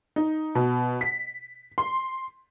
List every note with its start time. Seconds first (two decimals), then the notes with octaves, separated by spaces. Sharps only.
0.16 D#4
0.55 B2
1.01 B6
1.78 C6